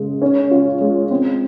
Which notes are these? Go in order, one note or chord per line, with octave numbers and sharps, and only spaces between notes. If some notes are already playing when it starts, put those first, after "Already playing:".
Already playing: C#3 G#3
C#4
F4
G#3
C4